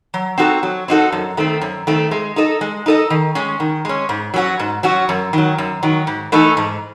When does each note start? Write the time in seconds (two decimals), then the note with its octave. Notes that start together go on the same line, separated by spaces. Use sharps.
0.14 F#3
0.38 C4 D#4 F#4 A4
0.63 F#3
0.88 C4 D#4 F#4 A4
1.12 F#2
1.37 D#3 A3 C4
1.61 F#2
1.87 D#3 A3 C4
2.11 G#3
2.36 D#4 A4 D#5
2.61 G#3
2.86 D#4 A4 D#5
3.10 D#3
3.35 G#3 C#4
3.60 D#3
3.85 G#3 C#4
4.09 G#2
4.34 F#3 C#4 F#4
4.59 G#2
4.83 F#3 C#4 F#4
5.09 F#2
5.33 D#3 F#3
5.58 F#2
5.83 D#3 F#3
6.07 G#2
6.32 E3 A3 D#4 A4
6.57 G#2